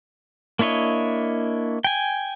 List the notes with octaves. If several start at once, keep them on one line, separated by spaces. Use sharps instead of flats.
A#3 D4 E4 C#5 D#5
G5 G#5